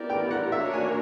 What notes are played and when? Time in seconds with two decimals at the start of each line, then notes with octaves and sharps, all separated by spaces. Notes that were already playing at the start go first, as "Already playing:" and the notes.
Already playing: B3 E4 G4 A#4 D5
0.10 G5
0.31 F#5
0.52 A#3 D4 F#4 A#4 C#5 E5
0.73 G#5